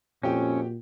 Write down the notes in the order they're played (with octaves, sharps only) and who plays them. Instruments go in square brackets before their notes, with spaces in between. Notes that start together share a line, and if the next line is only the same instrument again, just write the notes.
[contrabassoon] F2 [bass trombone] A#2 [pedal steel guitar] C#4 [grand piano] F#4 G4 G5